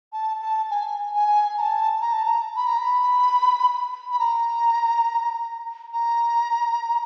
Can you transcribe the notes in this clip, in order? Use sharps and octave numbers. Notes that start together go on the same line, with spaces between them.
A5
A5
G#5
G#5
A#5
A5
A#5
A5
A#5
B5
A#5
B5
B5
A#5
A#5